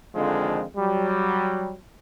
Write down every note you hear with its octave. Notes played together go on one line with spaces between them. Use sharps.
F2 D3 D#3 F3 G#3
F#3 G3